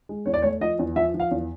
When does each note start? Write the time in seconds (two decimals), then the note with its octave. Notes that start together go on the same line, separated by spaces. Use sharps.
0.09 G#3
0.26 E2 C#5
0.34 D5
0.42 A3 C#5
0.61 F3 D#5
0.79 E2
0.96 F3 E5
1.14 F3
1.20 F5
1.31 E2